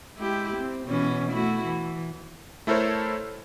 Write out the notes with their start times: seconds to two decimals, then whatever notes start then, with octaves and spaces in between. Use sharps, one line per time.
0.16 G#3 E4 G4
0.56 C4
0.88 B2 E3 C#4
1.31 A3 E4 F#4
1.65 E3
2.67 A3 E4 A4 A#4 C5 C#5